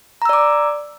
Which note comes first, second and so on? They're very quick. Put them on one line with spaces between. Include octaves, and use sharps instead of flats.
A#5 E6 D5 D6